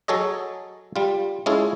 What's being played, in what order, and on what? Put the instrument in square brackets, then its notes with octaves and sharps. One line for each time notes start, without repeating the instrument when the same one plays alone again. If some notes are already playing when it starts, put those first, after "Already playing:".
[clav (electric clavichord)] F#3 G#4 A4 C#5 D#5
G3 F4
G#3 C#4 E4 F4 G#4 A4